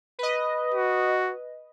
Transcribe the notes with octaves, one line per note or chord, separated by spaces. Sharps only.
B4 D#5
F#4